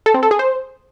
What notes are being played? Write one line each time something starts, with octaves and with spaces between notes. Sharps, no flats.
A4
C4
A4
G#4
C5